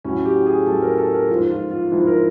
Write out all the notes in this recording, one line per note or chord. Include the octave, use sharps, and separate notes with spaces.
A2 F#3 C#4
G4
G#4
A2 F#3 A4
A#4
A4
A#4
G#2 F3 F4
F4
F4
G#2 F3 E4
A#4